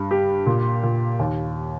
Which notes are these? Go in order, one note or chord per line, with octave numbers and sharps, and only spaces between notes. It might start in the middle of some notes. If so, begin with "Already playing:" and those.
Already playing: G2
G4
A#2
A#2
D#2